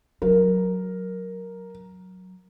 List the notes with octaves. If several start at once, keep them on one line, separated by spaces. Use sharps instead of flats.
F#3 A#4